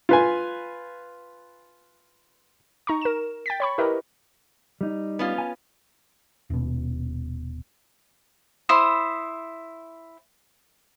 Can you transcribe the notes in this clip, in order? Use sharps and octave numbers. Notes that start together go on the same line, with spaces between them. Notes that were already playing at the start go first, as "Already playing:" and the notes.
F4 B4 G#5
D#4 A#5 C#6
A#4 E7
G5 A6 B6
C#5 B5 C#6
E4 G4 A#4 B4 D#5
G3 D#4
B3 C#4 F4
G#5
D#1 B2
E4 C5 D#6